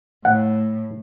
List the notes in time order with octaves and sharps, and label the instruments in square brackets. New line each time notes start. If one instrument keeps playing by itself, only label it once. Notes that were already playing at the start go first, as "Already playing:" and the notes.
[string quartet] A2 [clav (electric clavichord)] F#5